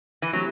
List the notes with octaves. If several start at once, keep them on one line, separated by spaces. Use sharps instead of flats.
E3
F#3 A3 C4 E4 G4